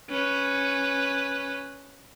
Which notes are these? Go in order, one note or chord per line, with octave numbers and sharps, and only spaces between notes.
C#4 B4